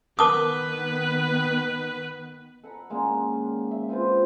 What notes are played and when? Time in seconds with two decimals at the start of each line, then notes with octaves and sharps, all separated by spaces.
0.19 D#3 B3 A#4 B4 A5 D6 D#6
2.63 A4 F#5 A#5 B5
2.90 G#3 A#3 C#4 D4
3.34 D#3
3.71 E5
3.89 C4 F4 B4 C5